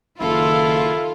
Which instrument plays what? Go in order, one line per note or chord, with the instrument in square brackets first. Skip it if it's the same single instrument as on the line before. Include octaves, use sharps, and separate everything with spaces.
[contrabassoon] F#1 [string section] D#3 F4 [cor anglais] E4 [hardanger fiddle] A4